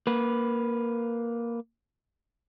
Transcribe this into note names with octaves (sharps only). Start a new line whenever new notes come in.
A#3 B4